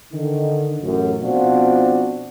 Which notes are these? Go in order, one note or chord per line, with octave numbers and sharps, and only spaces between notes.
D3 D#3
A1 F#2
B2 F3 C4 D4 F4 F#4